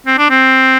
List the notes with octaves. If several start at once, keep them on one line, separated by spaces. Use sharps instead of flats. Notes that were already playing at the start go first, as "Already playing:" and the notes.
C4
D4
C4